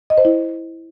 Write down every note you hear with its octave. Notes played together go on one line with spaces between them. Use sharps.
D#5
C5
E4